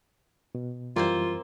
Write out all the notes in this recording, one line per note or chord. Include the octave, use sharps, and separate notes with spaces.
B2
F#2 E3 G3 A#3 C4 F4 C5